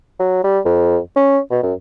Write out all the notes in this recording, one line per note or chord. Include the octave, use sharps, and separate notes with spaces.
F#3
G3
F2
C#4
B2
F#2